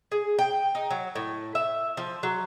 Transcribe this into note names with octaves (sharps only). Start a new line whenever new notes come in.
G#4
G5
D#4
F#3
A2
E5
F3
F#3